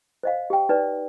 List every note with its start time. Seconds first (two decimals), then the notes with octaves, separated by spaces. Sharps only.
0.23 C5 D#5 F5
0.50 G4 G5
0.69 D#4 B4 D5